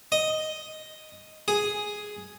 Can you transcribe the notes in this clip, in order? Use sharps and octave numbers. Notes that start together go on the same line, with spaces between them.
D#5
G#4